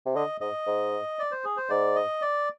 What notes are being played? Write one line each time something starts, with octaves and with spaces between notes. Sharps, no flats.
C3
D3 D#5
G#2 D#5
G#2
D5
C5
G#4
C5
G#2 D5
D#5
D5